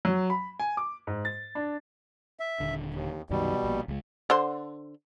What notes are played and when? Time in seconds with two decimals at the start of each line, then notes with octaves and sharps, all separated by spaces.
0.05 F#3
0.30 B5
0.60 G#5
0.77 D6
1.07 G#2
1.25 A6
1.55 D4
2.40 E5
2.60 D#1 D3
2.94 D#2
3.30 C2 F#2 B2 D#3 G3
3.63 A#1 A#2
3.88 C#2 G#3
4.30 D3 C5